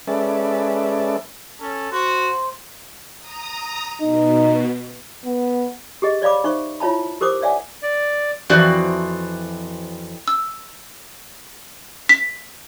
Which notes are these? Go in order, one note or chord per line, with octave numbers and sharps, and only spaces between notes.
G#3 C#4 A4 B4 D5 E5
C#4 A4
F#4 C5
A#5 D#6
B2 D#4
B3
G4 G#4 D#5
C#5 D5 F5 B5 D6
D#4 C5 E5 C#6
E4 F4 C#5 E5 A5 B5
G4 A#4 C5 D6 D#6
C#5 D5 E5 F#5 G#5 D6
D5
F2 E3 C4 F#4 D5
E6
B6